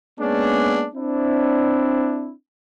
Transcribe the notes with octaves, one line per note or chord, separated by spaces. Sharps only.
G#3 A#3 B3 C#4 D4
C4 D4 E4